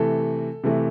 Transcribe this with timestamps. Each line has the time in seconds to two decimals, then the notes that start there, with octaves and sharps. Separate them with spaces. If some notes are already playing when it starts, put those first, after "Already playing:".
Already playing: C3 E3 A3 A4
0.64 C3 E3 A3